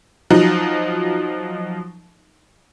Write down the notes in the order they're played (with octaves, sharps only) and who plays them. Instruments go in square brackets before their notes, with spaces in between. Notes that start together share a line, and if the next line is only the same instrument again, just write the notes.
[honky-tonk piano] F3 F#3 D#4